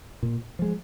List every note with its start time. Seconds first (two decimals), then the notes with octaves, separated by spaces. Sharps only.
0.23 A#2
0.59 F3 G#3